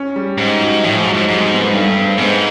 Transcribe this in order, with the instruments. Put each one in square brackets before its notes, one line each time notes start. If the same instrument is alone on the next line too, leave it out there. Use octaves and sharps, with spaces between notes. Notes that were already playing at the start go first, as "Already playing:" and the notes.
Already playing: [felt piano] C#4
G3
[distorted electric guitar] G#2
[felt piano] F#3
[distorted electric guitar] A2 [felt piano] F3
[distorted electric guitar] G#2
[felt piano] F#3
[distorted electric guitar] G#2
[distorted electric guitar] G#2 [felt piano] G3
[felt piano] C4
B3
A#3
[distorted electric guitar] G2 [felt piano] A3
[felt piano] A3
B3
C4
[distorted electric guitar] G#2 [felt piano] B3